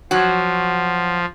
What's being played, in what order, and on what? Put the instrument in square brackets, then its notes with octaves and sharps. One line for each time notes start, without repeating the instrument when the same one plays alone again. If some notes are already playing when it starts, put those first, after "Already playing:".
[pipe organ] F3 [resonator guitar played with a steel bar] F#3 F#4